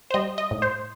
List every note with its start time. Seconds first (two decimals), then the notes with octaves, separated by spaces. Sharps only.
0.11 C5
0.14 G3 D#5
0.38 D#5
0.51 A2
0.62 C5